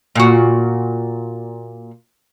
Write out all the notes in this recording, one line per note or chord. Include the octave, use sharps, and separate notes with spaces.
A#2 F#4